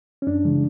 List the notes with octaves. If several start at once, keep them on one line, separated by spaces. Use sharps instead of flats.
C#4
F#2 D4
C#3 E3 G#3